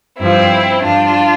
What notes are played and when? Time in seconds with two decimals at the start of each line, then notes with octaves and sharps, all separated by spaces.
0.19 G2 F3 C4 E4
0.84 G2 F3 D4 F4